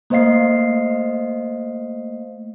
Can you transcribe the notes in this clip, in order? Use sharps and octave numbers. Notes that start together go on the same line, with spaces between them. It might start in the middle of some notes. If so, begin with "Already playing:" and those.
A3 A#3 C5 D#5 F5 C7